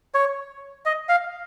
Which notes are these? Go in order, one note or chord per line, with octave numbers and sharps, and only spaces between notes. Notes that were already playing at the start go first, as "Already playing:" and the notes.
C#5
D#5
F5